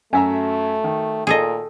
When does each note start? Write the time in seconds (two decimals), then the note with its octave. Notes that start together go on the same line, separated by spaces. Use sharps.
0.13 F#2 A3 F#4 E5 G#5 A#5
0.84 D#3
1.27 A#2 G#4 A4 D#5